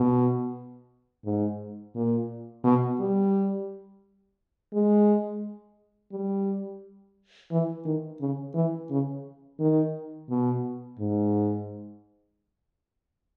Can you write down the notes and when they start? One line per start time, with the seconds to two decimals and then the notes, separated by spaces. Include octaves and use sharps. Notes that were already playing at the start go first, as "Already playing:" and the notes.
Already playing: B2
1.25 G#2
1.95 A#2
2.64 B2
3.00 G3
4.73 G#3
6.12 G3
7.51 E3
7.85 D#3
8.20 C#3
8.55 E3
8.90 C#3
9.60 D#3
10.30 B2
10.99 G#2